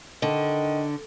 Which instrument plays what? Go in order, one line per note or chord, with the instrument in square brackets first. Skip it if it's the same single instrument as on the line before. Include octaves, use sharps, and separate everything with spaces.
[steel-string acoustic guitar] D3 [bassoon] D#3